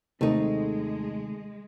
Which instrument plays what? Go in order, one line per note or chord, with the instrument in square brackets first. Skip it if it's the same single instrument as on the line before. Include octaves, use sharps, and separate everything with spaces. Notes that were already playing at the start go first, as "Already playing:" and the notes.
[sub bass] D#2 [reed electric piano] C3 D#3 [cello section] G#3 [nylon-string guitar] A3 D#4